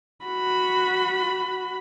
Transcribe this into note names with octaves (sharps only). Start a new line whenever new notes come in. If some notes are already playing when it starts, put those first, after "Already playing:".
F#4 B5